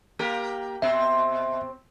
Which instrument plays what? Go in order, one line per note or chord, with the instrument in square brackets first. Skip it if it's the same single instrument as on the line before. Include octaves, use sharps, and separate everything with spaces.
[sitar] A#3 G4 A#4
[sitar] B2 C4 [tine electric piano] E5